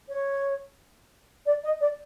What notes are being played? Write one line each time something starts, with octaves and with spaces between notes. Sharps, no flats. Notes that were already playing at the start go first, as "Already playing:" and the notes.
C#5
D5
D#5
D5